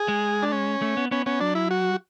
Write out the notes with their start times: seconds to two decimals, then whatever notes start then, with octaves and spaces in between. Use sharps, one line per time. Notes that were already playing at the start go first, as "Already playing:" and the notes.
Already playing: G#4
0.08 G#3
0.43 D4
0.52 C#4
0.82 A3
0.97 B3
1.11 B3 C#4
1.26 B3 C#4
1.40 F#3 D4
1.55 E4
1.71 F#4